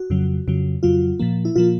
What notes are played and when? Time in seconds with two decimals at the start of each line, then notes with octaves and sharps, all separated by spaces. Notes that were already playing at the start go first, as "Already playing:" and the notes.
Already playing: F#4
0.10 F2 C#3 F#3
0.48 F2 C#3 F#3
0.83 F2 C#3 F#3 F4
1.19 A#2 F3 A#3
1.45 E4
1.56 A#2 F3 A#3 F4